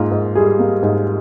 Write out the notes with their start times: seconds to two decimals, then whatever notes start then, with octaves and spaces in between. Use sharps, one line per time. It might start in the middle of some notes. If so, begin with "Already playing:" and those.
Already playing: G#2 A#3 F4
0.11 G#2
0.35 G3 G#4
0.59 A#3
0.83 G#2